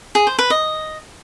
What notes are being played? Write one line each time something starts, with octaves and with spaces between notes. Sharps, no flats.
G#4
C5
B4
D#5